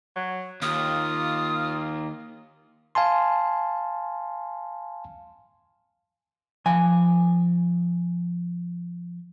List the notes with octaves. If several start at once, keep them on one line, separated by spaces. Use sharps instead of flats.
F#3
D#2 F4 D#6
F5 G#5 A5 C6
F3 G#5